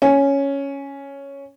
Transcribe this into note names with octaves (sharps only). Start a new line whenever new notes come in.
C#4